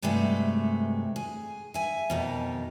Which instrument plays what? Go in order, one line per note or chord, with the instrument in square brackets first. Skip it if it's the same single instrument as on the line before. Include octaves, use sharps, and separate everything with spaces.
[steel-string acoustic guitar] G2 C3 F#3 G#3 A3
G#4
E5 G#5
F2 B2 D#3